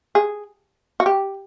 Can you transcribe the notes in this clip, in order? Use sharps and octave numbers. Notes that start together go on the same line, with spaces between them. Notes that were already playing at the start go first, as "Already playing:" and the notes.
G#4
F#4
G4